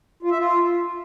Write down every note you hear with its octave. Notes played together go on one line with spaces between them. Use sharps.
F4
E5
F4